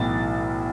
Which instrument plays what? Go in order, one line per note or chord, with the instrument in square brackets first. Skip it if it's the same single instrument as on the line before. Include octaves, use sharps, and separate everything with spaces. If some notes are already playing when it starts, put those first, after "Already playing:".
Already playing: [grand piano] B1 A2 E3 A6